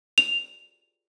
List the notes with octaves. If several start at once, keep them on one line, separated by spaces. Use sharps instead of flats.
F7